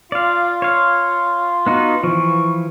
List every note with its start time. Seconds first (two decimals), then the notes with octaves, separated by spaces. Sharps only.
0.12 F4 D5 F5
0.62 C#5 F5
1.66 B3 D#4 F#4
2.04 E3 F3 C#6